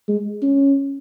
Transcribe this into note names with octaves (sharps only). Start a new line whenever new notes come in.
G#3
C#4